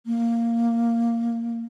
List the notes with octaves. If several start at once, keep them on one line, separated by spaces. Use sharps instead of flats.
A#3